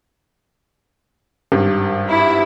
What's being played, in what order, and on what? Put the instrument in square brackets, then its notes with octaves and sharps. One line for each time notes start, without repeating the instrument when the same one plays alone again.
[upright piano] G#1 G2
[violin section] E4